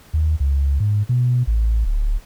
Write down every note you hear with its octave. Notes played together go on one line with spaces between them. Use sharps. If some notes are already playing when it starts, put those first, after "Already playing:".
D#2
C#2
G#2
B2
A1
D1